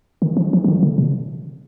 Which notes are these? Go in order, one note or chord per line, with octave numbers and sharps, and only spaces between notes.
D#3
F3
F3
F3
D#3
D3
C3